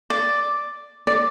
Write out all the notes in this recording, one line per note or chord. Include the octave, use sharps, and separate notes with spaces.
D5
D5